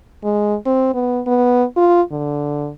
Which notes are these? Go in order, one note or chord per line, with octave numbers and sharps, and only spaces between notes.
G#3
C4
B3
B3
F4
D3